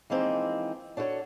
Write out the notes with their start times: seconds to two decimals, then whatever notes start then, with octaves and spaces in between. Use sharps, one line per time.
0.10 E3 F3 G#3 A#3 C4 D#4
0.97 D4 F#4 A4 B4 C#5